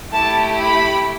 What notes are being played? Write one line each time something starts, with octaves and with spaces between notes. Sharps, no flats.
A3 E4 G4 A5
B5